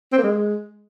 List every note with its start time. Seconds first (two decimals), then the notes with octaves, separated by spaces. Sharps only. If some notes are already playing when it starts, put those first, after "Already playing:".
0.13 C4
0.18 A#3
0.23 G#3